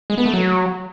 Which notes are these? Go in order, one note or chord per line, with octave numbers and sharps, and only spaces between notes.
G#3
B3
A3
F#3